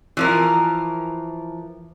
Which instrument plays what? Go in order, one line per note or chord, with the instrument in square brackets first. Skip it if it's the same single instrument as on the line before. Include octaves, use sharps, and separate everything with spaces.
[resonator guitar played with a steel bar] E3 F3 A#4